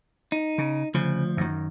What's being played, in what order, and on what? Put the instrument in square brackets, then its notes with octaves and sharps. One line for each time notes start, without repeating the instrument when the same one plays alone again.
[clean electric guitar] D#4
[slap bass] C#3
[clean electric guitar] D2 F3 [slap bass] C#3
[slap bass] F#2 D#3